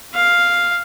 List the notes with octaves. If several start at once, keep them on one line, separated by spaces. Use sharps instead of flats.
F5